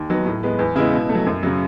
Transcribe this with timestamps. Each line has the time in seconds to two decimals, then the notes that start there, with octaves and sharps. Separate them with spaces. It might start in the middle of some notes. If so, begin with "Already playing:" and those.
Already playing: D#2
0.09 D#3 F#3 B3
0.26 A2
0.43 G#3 B3
0.59 E2
0.76 C#3 G#3 B3 E4
0.93 B2
1.09 A3
1.15 F#3
1.26 F#2
1.43 C#3 F#3